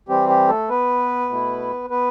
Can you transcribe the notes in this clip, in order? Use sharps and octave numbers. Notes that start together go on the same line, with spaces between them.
E3 G3 C4 G4
G4
A3 A4
B3 B4
B2 A3 E4
B3 B4